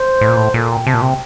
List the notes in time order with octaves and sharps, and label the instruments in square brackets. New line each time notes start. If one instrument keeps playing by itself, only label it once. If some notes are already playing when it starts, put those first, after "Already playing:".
Already playing: [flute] C5
[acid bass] A2
A#2
A2
[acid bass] A#2 [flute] A4
[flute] G5
[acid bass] C3 [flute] A5
[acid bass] A#2
[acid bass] C3 [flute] G5